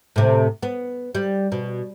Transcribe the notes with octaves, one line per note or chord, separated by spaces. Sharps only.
A2 C3
B3
G3
B2